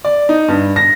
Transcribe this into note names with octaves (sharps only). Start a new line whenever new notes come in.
D5
D#4
G2
A#6